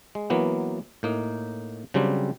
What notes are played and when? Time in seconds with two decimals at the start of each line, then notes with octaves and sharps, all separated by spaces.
0.15 G#3
0.30 E3 F#3 A#3 B3
1.03 A2 A#3 D#4
1.94 C#3 F#3 G3 C4 D4